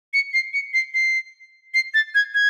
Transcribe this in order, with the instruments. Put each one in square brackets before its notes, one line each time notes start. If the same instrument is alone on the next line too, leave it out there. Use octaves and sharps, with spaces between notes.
[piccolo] C#7
C7
C#7
C7
C7
C7
A6
G#6
G#6